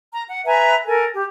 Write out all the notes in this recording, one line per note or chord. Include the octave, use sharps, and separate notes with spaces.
A#5
F#5
B4 E5 G#5 A#5
A4 A#4 G#5
G4